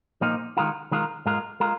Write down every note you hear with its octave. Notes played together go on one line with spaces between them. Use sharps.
A#2 F3 A#3 D#4
D#3 G#3 F4 A#4
D#3 G#3 F4 A#4
G#2 G#3 F4 A#4
G#3 F4 A#4